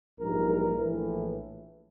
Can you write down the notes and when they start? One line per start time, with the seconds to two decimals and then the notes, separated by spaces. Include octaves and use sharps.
0.19 A#1 G#2 E3 G3 A#4
0.49 A#4
0.79 A#1 A2 E3